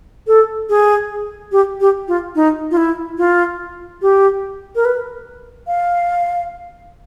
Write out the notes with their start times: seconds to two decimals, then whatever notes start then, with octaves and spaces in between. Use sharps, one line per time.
0.27 A4
0.69 G#4
1.52 G4
1.81 G4
2.08 F4
2.35 D#4
2.71 F4
2.77 E4
3.18 F4
4.02 G4
4.76 A#4
4.85 B4
5.67 F5